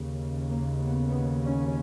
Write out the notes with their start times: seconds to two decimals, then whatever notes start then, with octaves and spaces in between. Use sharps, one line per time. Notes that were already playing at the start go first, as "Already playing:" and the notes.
Already playing: D#2 C#3
0.50 A#3
0.80 B3
1.11 B3
1.42 C#4